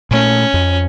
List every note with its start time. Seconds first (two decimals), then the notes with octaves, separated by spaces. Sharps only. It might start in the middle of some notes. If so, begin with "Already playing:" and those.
0.11 A#2 A3 C#4
0.54 F2